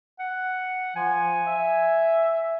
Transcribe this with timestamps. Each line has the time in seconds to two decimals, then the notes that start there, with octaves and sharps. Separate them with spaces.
0.19 F#5
0.96 F3 G#5
1.47 E5